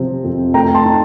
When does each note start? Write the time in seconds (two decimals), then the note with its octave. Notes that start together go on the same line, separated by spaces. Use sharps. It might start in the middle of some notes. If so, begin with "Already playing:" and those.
Already playing: C3 F3 C4
0.24 F2
0.54 A3 G5 A#5
0.75 A5 C6
0.84 D#4